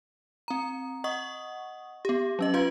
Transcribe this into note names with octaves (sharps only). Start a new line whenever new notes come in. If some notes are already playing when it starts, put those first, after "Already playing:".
C4 A#5
D#5 F#5 C#6 D#6
B3 G4
F#3 C#4 D#5
F4 B4 F5 C6 G6